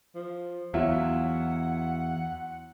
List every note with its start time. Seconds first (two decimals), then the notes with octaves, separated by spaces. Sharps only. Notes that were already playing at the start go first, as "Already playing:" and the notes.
0.15 F3
0.74 E2 F#3 E4 F4 F#5